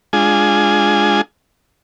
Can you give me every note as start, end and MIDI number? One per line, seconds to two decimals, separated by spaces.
0.13 1.21 56
0.13 1.21 62
0.13 1.21 65
0.13 1.21 68
0.13 1.21 80